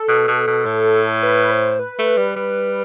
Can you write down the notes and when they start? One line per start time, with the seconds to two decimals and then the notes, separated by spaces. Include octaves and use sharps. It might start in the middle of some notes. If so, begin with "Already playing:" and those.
Already playing: A4
0.08 B2
0.27 B2
0.47 B2
0.66 A2
1.23 B4
1.51 C5
1.79 B4
1.99 A3
2.17 G3
2.36 G3